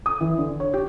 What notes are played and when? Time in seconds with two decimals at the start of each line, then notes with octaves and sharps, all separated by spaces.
0.06 D#6
0.21 E3
0.38 D3
0.60 C#5
0.74 G4